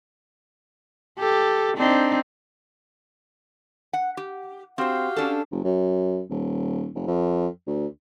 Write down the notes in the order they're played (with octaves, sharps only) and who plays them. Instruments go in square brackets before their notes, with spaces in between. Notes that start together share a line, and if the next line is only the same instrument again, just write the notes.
[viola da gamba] G4 A4
C4 D4 D#4
[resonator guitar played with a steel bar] F#5
G4
[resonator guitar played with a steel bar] C4 C5 [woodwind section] F#4 G4 F5
[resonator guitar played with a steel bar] C#4 D4 A4
[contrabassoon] F#1
F#2
D#1
F1
F2
D2